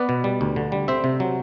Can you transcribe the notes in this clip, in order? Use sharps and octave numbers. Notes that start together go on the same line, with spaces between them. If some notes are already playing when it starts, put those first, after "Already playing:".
Already playing: B3 B4 D5
B2
G3
D2
D3
G3
C4 C5 E5
C3
F#3